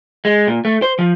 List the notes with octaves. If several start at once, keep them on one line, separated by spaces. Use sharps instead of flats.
G#3
A#2
A3
C5
F3